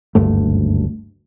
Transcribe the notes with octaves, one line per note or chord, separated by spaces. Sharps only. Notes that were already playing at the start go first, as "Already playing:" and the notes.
F#1 D2 G2 A3